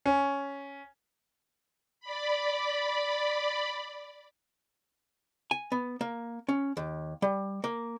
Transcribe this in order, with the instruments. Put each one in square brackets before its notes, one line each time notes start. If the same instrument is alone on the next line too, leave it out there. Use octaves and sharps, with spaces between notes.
[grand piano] C#4
[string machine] D5 B5
[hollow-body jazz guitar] G#5
B3
A#3
C#4
D#2
G3
A#3